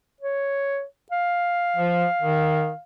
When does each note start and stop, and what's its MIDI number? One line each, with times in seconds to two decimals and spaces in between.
0.21 0.84 73
1.12 2.82 77
1.77 2.06 53
2.22 2.71 51